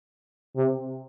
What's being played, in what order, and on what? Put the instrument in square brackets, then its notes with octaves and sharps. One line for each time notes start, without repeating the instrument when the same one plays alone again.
[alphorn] C3